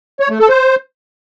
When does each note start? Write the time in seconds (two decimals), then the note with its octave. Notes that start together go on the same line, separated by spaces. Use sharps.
0.20 C#5
0.29 A3
0.39 A4
0.49 C5